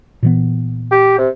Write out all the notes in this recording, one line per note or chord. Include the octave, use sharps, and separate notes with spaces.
A#2 E3 B3
G4
C3